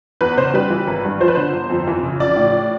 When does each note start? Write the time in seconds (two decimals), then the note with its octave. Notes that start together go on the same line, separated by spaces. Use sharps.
0.21 E2 B4
0.37 C#3 C5
0.54 G3 B4
0.70 E3
0.87 G#1
1.05 G2
1.20 F3 C5
1.28 B4
1.35 D3 C5
1.53 G1
1.70 F2
1.87 E3
2.03 C#3
2.19 A#1 D5
2.36 A2